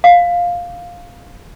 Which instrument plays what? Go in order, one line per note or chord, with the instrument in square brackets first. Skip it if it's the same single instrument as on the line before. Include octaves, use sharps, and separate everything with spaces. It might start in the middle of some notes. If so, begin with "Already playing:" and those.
[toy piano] F5